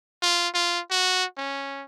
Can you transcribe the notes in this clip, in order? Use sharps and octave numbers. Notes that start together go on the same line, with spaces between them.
F4
F4
F#4
C#4